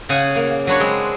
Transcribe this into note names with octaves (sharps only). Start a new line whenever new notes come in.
C#3 G#4 F#5 G#5
A#3
F#3 D4 B4 C#5
G#3 C4 G#4